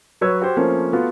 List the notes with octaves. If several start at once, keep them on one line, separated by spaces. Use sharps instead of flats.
F#3 B4 C#5 E6 G#6
F#4 G4 C5
F3 A3 A#3 C4 C#4
A3 B3 F4 F#4